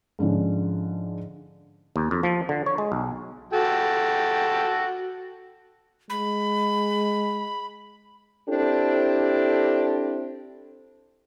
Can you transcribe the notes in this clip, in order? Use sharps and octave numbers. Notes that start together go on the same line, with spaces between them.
G#2 D3 F3 C#4
D#2
F2
F3
D3
C#5
G#3
B1
F#4 A4 G5
G#3 B5
C4 D4 E4 G4 A4